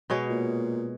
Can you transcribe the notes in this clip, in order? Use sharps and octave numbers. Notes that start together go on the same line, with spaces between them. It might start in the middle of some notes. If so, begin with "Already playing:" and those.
B2 G#3 C#5
A#2